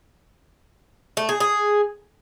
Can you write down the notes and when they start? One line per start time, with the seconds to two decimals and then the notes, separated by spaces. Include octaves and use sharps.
1.17 A3
1.29 G#4
1.40 G#4